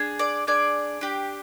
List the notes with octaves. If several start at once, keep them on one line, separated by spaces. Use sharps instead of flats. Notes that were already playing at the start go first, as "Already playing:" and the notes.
Already playing: D4 G#4
D5
D4 G#4 D5
D4 G4